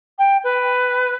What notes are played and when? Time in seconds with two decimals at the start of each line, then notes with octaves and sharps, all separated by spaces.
0.19 G5
0.44 B4